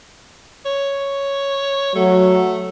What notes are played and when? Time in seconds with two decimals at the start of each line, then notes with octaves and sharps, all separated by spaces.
0.66 C#5
1.95 F#3 A3